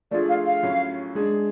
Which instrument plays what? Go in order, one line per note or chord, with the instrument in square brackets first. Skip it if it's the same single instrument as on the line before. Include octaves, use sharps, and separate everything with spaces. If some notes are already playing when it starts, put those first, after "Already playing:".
[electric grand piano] F3 A3 D4 F4 G#4 [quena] D5
[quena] F5
F5
[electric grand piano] A2 F#3 C#4
G#3 D4 G#4